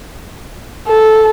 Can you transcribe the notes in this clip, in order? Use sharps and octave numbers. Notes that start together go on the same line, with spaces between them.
A4